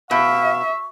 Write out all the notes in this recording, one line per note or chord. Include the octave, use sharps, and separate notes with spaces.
B2 E5 F5 C#6